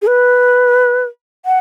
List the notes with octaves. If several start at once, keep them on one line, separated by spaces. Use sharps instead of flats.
G#4
B4
F#5